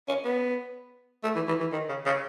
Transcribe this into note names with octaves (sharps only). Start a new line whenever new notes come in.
C#4
B3
A3
E3
E3
E3
D#3
C#3
C#3